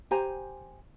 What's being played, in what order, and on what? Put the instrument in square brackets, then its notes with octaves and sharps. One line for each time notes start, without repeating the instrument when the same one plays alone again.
[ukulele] G4 C5 G#5 A#5